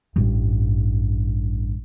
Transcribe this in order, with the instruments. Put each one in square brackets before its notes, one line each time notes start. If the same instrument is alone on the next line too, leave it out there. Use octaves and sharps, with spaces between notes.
[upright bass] A1 G2